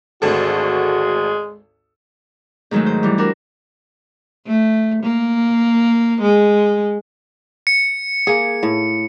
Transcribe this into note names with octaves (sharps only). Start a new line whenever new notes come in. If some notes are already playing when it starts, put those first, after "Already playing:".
G#1 D2 G#3 F#4 A4
G#2 D#3 F#3 G#3 A3
C5
E3 G3
D4 F#4 A#4
A3
A#3
G#3
C#7
A#3 G#4
A2